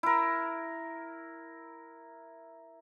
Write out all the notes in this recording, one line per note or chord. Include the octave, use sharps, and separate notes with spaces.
E4 A#4